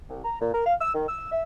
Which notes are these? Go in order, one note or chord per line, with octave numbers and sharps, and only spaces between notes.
C2
A#5
A#2
A#4
F5
E6
D#3
E6
E5